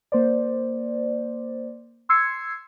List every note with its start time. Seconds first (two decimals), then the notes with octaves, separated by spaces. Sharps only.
0.12 A#3 C5 D5
2.09 C6 E6 G#6 C7 C#7